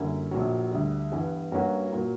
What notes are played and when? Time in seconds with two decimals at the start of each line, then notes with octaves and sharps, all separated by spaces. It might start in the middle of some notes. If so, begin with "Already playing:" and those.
Already playing: F#2 D3 G3 A#3 E4
0.31 A#1 A#2 F#3
0.71 D2 D3 G3
1.12 G2 E3 G3 B3
1.52 G2 F#3 A#3 C#4 F#4
1.92 A#2 F#3 A#3